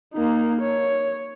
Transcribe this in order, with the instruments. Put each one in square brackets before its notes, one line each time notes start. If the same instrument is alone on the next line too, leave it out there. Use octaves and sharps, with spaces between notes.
[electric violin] A#3 D#4
C#5